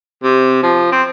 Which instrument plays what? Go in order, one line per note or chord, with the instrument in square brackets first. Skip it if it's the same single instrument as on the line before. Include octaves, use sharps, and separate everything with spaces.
[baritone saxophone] C3
F3
C4